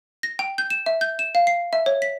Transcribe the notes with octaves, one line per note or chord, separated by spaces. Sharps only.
A#6
G5
G6
E7
E5
G6
E7
F5
C7
E5
C#5
B6